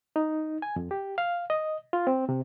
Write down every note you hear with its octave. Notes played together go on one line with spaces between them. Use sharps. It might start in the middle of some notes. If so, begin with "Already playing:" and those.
D#4
G#5
F2
G4
F5
D#5
F4
C4
C3